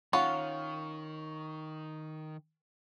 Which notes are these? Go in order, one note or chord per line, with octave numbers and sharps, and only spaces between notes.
D#3 C#4 F4 F#5 C#6